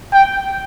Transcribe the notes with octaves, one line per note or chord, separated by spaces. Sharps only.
G5